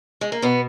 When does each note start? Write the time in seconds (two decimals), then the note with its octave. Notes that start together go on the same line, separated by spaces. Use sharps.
0.21 G#3
0.32 A#3
0.42 B2 B3